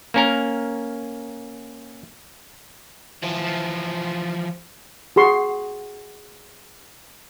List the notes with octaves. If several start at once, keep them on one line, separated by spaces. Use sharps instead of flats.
A#3 C#4 A#4
E3 F3
F#4 G#4 C6 C#6